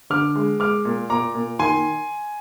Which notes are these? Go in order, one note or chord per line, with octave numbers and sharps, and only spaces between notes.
D3 D6 F6
G#3
G#3 D6 F6
A#2
A#2 A#5 D6
A#2
D#3 G#5 C6